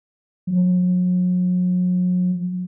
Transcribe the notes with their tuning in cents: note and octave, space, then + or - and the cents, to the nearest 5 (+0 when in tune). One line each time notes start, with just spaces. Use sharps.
F#3 -40